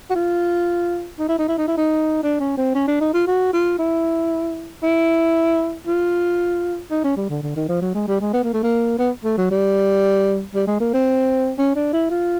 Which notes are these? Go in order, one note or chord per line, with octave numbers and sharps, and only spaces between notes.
F#4
F4
D#4
E4
D#4
E4
D#4
E4
D#4
D4
C#4
C4
C#4
D4
D#4
F4
F#4
F4
E4
E4
F4
D#4
C#4
G3
D3
D3
D#3
F3
F#3
G#3
G3
G#3
B3
A#3
A3
A#3
B3
A3
F#3
G3
G3
G#3
A#3
C4
C#4
D4
E4
F4